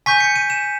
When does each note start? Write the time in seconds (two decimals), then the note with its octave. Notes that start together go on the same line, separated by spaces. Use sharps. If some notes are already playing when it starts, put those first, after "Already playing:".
0.06 G#5 C#6 G6 B6
0.20 C#7
0.36 D#7
0.50 E7